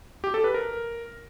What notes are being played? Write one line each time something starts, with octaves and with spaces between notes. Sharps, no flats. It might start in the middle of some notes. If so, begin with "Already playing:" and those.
G4
A4
B4
A#4